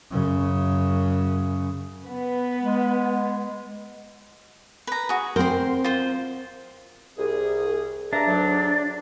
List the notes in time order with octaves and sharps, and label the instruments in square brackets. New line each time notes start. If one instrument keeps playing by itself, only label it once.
[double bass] F#2 C#3
[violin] B3 B4
[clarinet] G#3
[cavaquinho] B4 A#5
F#4 G#4
[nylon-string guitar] C4 A#4 [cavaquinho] C5 C6
[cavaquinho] F4 C5
[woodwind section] C2 G#4
[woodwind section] G2 E5 A#5 [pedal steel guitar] D4
[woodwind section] D2 G#2 F#3